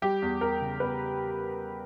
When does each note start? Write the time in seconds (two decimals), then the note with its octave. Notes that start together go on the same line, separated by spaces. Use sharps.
0.02 G3 G4
0.22 E2
0.41 E2 A#4
0.61 C#3
0.80 E2 B4